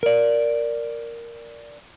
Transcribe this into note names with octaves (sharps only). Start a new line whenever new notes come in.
A#4 D5